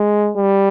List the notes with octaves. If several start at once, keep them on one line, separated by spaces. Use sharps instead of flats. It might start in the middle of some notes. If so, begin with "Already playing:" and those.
Already playing: G#3
G3